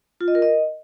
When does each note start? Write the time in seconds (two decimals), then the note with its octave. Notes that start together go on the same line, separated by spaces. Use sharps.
0.21 F4
0.28 D#5
0.35 A#4
0.42 D#5